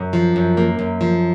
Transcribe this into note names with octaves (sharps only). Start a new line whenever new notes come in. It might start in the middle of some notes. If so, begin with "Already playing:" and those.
Already playing: F#2
F3
F#2
A#3
F#2
F3